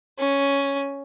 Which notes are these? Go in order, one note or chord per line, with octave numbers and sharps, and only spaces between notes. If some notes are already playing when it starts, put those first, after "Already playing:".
C#4